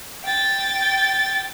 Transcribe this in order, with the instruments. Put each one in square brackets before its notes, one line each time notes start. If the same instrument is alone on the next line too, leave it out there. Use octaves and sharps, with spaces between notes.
[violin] G5 A6